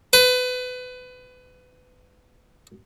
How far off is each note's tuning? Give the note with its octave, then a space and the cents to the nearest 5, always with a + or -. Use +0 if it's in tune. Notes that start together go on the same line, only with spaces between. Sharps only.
B4 +25